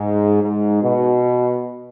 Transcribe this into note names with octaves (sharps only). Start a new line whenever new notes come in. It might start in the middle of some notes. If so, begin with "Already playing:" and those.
Already playing: G#2
G#2
B2